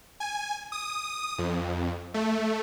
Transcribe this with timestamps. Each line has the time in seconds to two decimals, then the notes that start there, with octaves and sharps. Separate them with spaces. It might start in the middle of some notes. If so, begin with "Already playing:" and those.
0.20 G#5
0.72 D#6
1.38 F2
2.14 A3